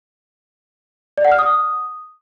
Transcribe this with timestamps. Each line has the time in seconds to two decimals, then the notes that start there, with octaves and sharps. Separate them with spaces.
1.18 D5
1.25 F#5
1.32 F6
1.39 D#6